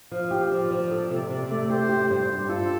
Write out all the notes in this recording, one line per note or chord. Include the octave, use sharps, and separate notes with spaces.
F3 F5
G4
F3 D5
F3
A4
C3
C3
A3
G4 C5
G4
G2 C5
G4
F4 A4